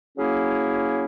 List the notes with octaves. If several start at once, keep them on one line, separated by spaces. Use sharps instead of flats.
F#3 A#3 C#4 E4 G#4